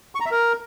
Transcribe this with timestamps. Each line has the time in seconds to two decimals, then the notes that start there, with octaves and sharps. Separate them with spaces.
0.15 C#6
0.20 A#5
0.26 E5
0.31 A#4